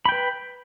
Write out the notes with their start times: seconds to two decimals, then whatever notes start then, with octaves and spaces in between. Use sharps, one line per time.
0.05 B5
0.09 G5
0.12 B4